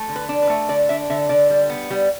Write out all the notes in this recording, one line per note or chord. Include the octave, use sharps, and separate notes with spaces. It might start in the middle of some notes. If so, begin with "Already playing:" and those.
Already playing: A3
D3
B4
D4
B4
A3
D3 D5
D4 E5
D3 E5
D3 D5
G3
B3
G3